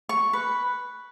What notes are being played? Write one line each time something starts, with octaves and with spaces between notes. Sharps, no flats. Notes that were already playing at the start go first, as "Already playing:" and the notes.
C#6
B4